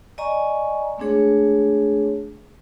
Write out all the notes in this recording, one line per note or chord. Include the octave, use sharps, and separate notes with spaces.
D5 D#5 G#5 A#5 C#6
G#3 A3 C4 D4 G#4 C#5